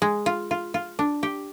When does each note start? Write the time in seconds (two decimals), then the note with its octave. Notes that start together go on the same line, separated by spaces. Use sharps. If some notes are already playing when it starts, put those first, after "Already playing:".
0.02 G#3
0.26 F4
0.51 F4
0.74 F4
0.99 D4
1.23 G4